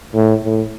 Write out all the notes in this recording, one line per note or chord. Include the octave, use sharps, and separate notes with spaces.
A2
A2